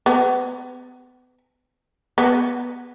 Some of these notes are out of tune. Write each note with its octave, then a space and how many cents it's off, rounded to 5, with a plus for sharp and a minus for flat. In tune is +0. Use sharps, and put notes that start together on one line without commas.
B3 +30
B3 -10